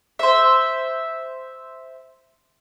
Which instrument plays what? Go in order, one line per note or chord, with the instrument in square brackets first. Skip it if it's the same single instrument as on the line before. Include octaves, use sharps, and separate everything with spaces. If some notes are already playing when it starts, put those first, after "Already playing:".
[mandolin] C5 E5